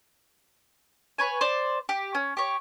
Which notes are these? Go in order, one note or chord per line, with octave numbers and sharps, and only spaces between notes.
B4 C#5 G#5
C5 D5
G4
C#4
G4 C#5